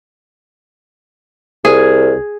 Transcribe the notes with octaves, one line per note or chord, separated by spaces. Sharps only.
C2 G#4